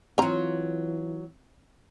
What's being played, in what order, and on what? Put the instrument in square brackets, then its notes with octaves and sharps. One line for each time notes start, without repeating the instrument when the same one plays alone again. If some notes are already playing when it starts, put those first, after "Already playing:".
[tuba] E3 [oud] F#3 F4 [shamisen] C4 A#5